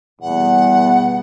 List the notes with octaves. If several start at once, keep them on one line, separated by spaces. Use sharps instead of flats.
E2 B2 G3 B3 F#5